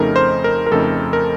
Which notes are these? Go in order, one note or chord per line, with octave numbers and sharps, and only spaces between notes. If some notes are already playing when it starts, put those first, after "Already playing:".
Already playing: F2 C#3 A3 D#4 A#4
C5
A#4
A#4
F2 C#3 A3 D#4 A4
A#4